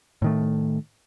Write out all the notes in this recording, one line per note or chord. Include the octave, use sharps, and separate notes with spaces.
A2 D#3 A3